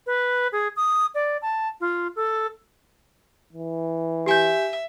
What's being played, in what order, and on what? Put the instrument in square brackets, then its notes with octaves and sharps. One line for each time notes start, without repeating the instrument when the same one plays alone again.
[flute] B4
G#4
D#6
D5
A5
F4
A4
[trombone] E3
[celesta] G4 G#5 G6 [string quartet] E5